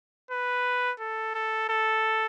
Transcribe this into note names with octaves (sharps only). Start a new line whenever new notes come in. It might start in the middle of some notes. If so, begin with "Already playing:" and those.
B4
A4
A4
A4